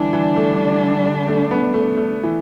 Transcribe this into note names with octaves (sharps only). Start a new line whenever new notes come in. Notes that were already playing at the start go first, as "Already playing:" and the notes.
Already playing: D3 E3 G3 D4
E3
A3
A3
B3
A3
A3
E3